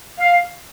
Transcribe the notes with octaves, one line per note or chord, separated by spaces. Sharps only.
F5